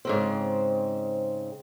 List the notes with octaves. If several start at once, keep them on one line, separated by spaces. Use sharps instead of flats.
G#2 C#3 C4